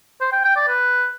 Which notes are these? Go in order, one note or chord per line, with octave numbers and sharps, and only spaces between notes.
C5
G5
G5
D5
B4